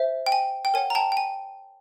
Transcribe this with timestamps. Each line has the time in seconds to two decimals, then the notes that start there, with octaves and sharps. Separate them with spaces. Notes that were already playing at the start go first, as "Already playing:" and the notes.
Already playing: C5 E5
0.26 G5
0.32 G#5
0.65 G5
0.74 A#4 C#5 F#5 G#5
0.90 A#5
0.95 G5 A5
1.12 G5
1.17 G#5